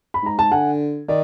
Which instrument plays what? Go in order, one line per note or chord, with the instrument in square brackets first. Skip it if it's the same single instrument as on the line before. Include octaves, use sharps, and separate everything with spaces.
[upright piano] B5
[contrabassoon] G#2 [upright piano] A#5
[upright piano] A5
[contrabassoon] D3 [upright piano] F#5 G#5
[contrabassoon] D#3 [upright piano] D5